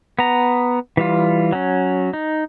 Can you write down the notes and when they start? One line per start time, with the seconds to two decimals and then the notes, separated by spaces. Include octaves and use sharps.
0.19 B3 A#5
0.97 E3 G3 F4
1.52 F#3 C#4
2.13 D#4